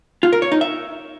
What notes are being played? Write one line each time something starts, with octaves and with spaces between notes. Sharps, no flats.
F4
A#4
C#5
D#4
E5